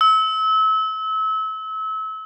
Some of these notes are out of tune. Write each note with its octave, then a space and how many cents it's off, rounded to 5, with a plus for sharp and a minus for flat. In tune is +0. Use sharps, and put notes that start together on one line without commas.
E6 -30